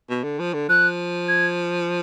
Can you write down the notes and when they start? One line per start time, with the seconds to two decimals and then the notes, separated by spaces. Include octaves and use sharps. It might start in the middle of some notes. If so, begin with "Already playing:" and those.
0.09 B2
0.23 D3
0.39 F3
0.54 D3
0.69 F3 F#6
1.28 G#6